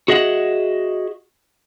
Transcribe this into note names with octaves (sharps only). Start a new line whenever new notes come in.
F#4 G#4 D#5 E5 F#5